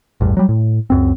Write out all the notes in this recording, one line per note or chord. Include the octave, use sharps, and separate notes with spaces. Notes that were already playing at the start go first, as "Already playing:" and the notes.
A1 E2 G2
F#3 G3
A2
C#2 F#2 C4